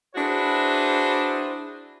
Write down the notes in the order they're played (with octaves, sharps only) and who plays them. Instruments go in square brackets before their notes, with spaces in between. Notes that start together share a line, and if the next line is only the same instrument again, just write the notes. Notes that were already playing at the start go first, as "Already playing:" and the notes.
[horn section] D4 E4 F#4 G#4 B4 C5